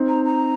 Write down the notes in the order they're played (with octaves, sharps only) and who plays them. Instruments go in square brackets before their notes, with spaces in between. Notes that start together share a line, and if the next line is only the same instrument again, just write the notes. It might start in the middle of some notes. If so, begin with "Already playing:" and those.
Already playing: [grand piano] C4 D#4
[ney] A#5
A#5